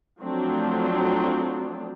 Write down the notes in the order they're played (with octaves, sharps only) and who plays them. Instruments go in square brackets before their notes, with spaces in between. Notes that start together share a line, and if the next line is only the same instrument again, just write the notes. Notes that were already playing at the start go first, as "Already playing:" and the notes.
[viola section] F3 F#3 A3 C4 D4